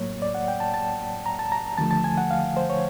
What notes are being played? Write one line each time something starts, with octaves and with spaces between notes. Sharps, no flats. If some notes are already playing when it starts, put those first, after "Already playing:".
Already playing: A2 F#3 A#3 C#5
D5
F#5
G5
A5
A5
A#5
A5
A#5
D#2 D3 F3 A3 A5
A5
G#5
F#5
F5
C5
C#5